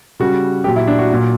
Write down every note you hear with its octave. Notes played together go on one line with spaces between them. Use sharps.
C#3 G3 F#4
A#2 F#3 G4
E4
D4
F#4
A#2 F#3